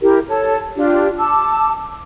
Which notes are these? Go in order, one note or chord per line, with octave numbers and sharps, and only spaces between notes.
E4 G4 A#4
A4 C#5 A5
D4 F4 G4
A5 D6 E6